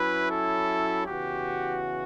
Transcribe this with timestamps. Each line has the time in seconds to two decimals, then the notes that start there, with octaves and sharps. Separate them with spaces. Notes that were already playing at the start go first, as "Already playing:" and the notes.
Already playing: F#3 C#4 E4 B4
0.31 A4
1.06 C#3 E3 B3 F#4 G4